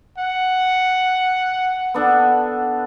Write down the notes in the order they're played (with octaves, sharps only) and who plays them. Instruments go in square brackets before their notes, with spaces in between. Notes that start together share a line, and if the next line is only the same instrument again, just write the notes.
[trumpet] F#5
[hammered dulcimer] B3 D4 A4